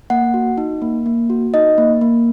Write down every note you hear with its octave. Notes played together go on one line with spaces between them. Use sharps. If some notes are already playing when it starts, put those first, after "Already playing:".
A#3 F#5
F#4
D#4
A#3
A#3
F#4
D#4 D#5
A#3
A#3